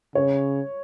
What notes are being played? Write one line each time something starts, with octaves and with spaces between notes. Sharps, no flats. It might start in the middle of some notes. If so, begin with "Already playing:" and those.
C#3 C#5